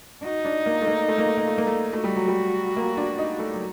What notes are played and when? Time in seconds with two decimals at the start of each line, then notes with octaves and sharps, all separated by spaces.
0.24 D#4 F#4
0.45 D4
0.66 A#3
0.81 A3
0.87 A#3
1.08 A3
1.18 A#3
1.28 A3
1.38 A#3
1.47 A3
1.58 A#3
1.67 A3
1.93 A3 F#4
2.04 G3
2.16 F#3
2.28 G3
2.77 A#3
2.97 D4
3.18 D#4
3.39 A3
3.54 F#3